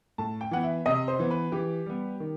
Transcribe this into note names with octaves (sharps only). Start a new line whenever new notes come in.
A2 A5
G5
E3 B3 F#5
E5
C3 D#5
C5
E3 B3
B4
E3 G4
G3 B3
D#3